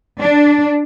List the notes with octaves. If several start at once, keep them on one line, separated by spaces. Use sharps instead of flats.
D4